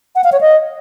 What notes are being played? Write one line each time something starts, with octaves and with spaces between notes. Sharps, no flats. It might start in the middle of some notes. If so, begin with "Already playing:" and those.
F#5
F5
C#5
D#5